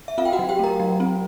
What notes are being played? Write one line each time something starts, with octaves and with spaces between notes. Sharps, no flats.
E5
C4 F4 F5
G5
F#4 F#5
F#3
G4 G5
A3 A#4 A#5
F#3
C4